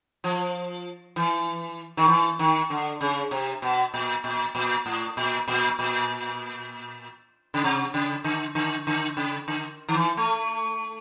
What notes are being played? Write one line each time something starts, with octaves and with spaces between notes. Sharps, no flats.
F3
E3
D#3
E3
D#3
D3
C#3
C3
B2
A#2
A#2
A#2
A2
A#2
A#2
A#2
C#3
C3
C#3
D3
D3
D3
C#3
D3
D#3
E3
A3